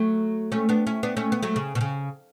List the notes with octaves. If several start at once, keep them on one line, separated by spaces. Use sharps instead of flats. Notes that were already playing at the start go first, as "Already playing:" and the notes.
Already playing: F#3 A3
A3 C#4
B3 D4
C#4 E4
B3 D4
A3 C#4
B3
F#3 A3
C#3
B2
C#3